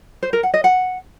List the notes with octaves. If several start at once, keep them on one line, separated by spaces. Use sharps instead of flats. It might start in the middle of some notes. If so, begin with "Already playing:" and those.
C5
A#4
F#5
D#5
F#5